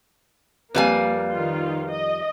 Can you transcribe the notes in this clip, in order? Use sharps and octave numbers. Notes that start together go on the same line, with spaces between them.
F2 G3 A#3 B4 F5 G#5
D#3 F4
D#5